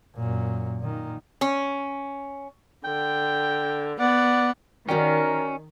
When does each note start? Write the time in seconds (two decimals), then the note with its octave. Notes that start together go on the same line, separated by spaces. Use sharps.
0.16 F#2 A#2
0.81 A#2 D#3
1.41 C#4
2.85 D3 G5
4.00 B3 D5 F#5
4.89 D#3 C#4 F#4 A#4 D5 G5